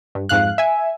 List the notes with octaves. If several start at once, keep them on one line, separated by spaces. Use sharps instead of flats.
G2
F2 G#2 F5 F#6
E5 G#5